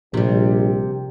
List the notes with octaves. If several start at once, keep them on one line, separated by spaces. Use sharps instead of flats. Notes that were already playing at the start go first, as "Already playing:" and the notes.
A#1 C3 G3